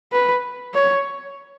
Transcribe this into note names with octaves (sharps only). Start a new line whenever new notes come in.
B4
C#5